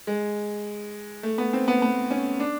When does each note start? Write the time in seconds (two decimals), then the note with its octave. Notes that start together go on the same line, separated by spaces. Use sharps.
0.07 G#3
1.23 A3
1.38 B3
1.53 C4
1.68 B3
1.82 B3
2.11 C#4
2.40 D4